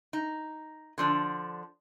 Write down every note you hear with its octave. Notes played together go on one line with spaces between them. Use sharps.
D#4
D3 F3 D4